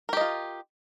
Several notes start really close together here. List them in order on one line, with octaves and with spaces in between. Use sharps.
A#4 G4 D#5 F4